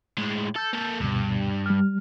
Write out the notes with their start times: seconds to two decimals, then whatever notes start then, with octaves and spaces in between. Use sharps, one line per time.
0.18 A2 G#3
0.56 A4 E6 G6
0.73 A#3 A4
1.00 D2 G2 B2
1.66 G3 F6